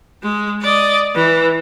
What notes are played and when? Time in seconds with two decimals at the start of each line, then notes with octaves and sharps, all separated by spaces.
0.23 G#3
0.62 D5 D#5
1.15 E3